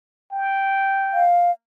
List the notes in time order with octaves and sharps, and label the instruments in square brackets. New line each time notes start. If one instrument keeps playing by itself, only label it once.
[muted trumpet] G5
[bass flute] F5